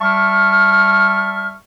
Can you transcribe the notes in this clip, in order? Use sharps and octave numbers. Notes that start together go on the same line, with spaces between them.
G3 E5 A5 C#6 F6